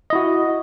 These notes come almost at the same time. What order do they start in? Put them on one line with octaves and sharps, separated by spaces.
D#5 E4 F#4